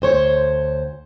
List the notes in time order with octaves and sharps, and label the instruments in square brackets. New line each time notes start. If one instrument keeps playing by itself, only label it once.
[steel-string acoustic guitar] D2 C5 C#5